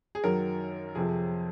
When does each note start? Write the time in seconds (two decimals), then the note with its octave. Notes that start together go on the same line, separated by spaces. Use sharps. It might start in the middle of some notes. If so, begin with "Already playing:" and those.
0.15 G#4
0.24 F#2 D#3 F#3 A#4
0.95 F2 C3 F3 G#4